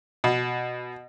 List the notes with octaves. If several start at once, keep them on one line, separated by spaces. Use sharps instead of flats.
B2